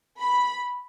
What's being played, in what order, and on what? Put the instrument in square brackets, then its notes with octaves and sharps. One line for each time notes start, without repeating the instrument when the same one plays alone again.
[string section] B5